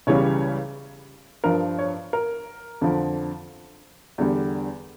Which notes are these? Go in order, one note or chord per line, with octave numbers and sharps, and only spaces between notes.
C#2 C#3 E3 G3 C#5
G2 F3 A#4
C#5
A#4
F2 D3 F3
E2 D3 G3